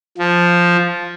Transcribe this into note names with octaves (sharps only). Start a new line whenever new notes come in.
F3